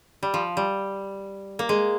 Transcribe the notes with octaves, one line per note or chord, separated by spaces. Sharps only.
G3
F3
G3
A#3
G#3